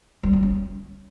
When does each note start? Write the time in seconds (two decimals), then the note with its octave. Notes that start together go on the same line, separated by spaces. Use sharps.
0.23 G3
0.33 A#3
0.43 C#4